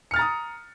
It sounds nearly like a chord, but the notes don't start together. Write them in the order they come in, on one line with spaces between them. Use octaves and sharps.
C#7 F6 A6 A#5 D#6